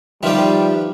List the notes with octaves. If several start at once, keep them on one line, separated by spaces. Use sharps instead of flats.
D#3 F3 G3 F4 G4 B4 E5